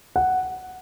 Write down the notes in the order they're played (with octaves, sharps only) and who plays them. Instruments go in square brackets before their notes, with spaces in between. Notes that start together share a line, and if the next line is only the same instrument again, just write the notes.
[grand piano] F#5